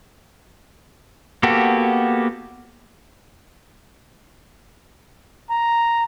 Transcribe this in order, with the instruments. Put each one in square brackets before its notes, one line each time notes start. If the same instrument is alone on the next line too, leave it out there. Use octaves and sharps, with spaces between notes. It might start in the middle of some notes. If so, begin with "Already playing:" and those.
[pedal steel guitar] A#3 B3 F#4 G4 A4
[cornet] A#5